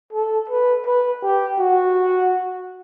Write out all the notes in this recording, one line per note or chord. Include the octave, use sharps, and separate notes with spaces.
A4
B4
B4
G4
F#4